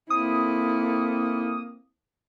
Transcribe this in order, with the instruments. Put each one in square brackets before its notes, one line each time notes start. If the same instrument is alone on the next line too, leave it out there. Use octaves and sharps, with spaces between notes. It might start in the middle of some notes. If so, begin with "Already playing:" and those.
[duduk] A#3 [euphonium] C4 [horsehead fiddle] E4 A4 [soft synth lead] D#6